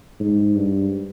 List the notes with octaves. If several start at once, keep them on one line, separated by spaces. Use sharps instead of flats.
G#2
G2